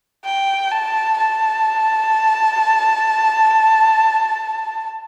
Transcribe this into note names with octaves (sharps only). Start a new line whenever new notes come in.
G5
A5
A5